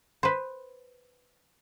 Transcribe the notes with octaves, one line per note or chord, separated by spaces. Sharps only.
B4 C5